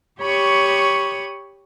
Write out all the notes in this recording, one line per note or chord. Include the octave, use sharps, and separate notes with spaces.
G4 C#5 B5 C#6 D#6